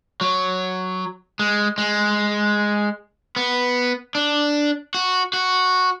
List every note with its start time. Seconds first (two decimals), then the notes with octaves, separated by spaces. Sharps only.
0.21 F#3
1.39 G#3
1.78 G#3
3.36 B3
4.15 D4
4.94 F#4
5.33 F#4